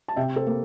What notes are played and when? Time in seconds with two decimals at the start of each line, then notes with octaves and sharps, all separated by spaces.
0.08 A5
0.16 C3 E5 G5
0.36 A4 C5
0.47 A#3